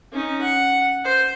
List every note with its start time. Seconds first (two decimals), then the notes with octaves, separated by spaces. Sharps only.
0.12 C#4 D#4
0.42 F#5
1.04 C5